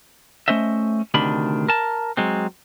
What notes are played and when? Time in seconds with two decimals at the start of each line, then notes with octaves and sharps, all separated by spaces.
0.48 A3 C#4 C5 D#5 E5
1.14 D2 C3 D#3 D4 B5
1.69 A#4 A5
2.17 F#3 G#3 C4